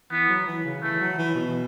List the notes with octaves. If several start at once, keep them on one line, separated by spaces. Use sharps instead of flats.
E3 B3
F#3
E3
C#3
E3 A3
F#3
E3
B2